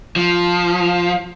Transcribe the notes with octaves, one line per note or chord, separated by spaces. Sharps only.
F3